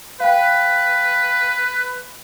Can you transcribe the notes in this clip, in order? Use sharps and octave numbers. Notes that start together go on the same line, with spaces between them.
B4 F5 G5